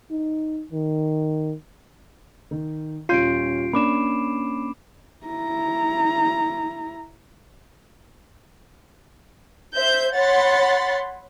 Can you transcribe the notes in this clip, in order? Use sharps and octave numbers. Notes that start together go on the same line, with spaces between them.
D#4
D#3
D#3
D#1 C#4 F4 C6 G6 C7 D7 D#7
A#3 C#4 D4 B5 D6 E7
E4 A#5
C5 E5 G6
C#5 F#5 B5 C6 A6